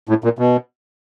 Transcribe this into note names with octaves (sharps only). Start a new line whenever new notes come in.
A2
A#2
B2